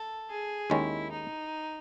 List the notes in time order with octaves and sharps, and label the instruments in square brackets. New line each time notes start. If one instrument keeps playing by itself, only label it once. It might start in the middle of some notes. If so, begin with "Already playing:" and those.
Already playing: [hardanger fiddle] A4
G#4
[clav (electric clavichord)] D#2 D#3 G#3 C#4 [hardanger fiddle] E4
[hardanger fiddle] D#4